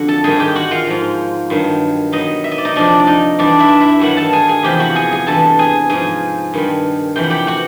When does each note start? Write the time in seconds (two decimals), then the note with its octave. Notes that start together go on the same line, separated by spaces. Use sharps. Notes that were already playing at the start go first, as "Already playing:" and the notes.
Already playing: F2 D3 F#4 F#5
0.08 A4 A5
0.24 G#2 D#3 G3 G#4 G#5
0.39 G4 G5
0.55 F#4 F#5
0.71 F4 F5
0.87 G#2 F3
1.50 G2 D#3 F#3
2.12 B2 F#3 D#4 D#5
2.44 E5
2.52 D#5
2.58 D5
2.65 D#4 D#5
2.76 F2 C3 F3 D4 D5
2.99 D5
3.07 D#4 D#5
3.39 G2 E3 G3 D4 D5
3.59 E4 E5
3.80 E4 E5
3.99 G2 D#3 F#3 F#4 F#5
4.17 A4 A5
4.33 G#4 G#5
4.48 G#4 G#5
4.63 E2 C3 F3 G4 G5
4.80 F#4 F#5
4.95 G#4 G#5
5.11 G#4 G#5
5.27 G2 E3 G3 A4 A5
5.59 G#4 G#5
5.89 G#2 F3 G#4 G#5
6.54 G2 D#3 G3
7.16 F2 C3 E3 G5
7.23 F#5
7.30 G4 G5
7.47 F#4 F#5